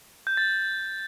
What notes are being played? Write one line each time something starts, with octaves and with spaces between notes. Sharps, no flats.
G6
A6